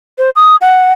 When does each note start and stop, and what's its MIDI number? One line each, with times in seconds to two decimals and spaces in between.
0.18 0.30 72
0.36 0.56 87
0.61 0.93 78